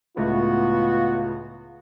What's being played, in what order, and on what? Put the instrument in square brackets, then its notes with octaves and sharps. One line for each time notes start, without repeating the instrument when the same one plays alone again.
[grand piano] C#2 A2 [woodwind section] B3 F#4 [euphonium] F4